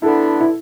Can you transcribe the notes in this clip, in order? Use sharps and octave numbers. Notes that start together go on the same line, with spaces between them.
D3 B3 D4 E4 A4
E4